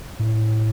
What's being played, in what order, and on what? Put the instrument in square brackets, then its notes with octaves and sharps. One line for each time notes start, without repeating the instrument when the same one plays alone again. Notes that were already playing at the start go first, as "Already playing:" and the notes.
[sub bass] A2